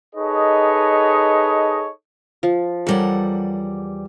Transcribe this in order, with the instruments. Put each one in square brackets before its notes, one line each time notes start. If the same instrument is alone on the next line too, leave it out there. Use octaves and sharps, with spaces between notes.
[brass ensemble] D#4 G#4 A4 B4 C#5 D#5
[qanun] F3
[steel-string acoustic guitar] E2 G3 F#5 [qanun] A4 A#4 C#5